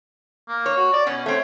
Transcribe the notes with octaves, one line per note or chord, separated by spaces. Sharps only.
A#3
C#5
F#4
D5
B2 C#4
A3 C4 C#5